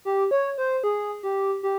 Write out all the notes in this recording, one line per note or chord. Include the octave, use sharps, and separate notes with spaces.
G4
C#5
C5
G#4
G4
G4